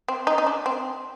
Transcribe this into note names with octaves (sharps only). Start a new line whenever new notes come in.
C4
D#4
D#4
D4
C4